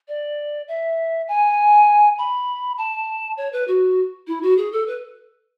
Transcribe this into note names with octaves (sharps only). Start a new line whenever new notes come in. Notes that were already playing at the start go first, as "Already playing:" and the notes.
D5
E5
G#5
B5
A5
C#5
B4
F#4
E4
F#4
G#4
A4
B4